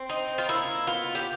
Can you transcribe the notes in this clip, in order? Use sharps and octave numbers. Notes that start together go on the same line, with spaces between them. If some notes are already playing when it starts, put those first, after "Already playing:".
Already playing: C4
D#4
F4
A#3 E4
B3 F4
G4